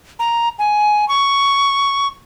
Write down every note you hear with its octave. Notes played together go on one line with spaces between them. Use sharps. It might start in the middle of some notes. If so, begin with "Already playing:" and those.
A#5
G#5
C#6